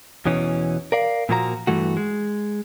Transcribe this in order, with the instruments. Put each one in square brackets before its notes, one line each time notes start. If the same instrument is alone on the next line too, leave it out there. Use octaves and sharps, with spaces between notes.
[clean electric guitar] E2 B2 E3 C#4
A#4 D5 F5
A#2 F3 A#3 F#4 A#4 A#5
G2 E3 A3 F#4
G#3